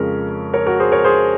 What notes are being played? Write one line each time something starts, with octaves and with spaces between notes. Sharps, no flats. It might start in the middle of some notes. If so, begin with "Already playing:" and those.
Already playing: F2 C#3 F3 G#3 C#4 A#4
A#4 C#5
F#4 A#4
G#4 C5
A#4 C#5
G#4 C5